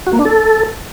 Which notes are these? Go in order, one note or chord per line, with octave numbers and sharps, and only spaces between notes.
F#4
A#3
D4
A4